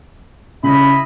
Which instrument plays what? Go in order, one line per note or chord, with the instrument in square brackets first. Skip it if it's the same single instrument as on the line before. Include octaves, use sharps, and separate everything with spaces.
[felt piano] C#3 [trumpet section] E4 D#5 B5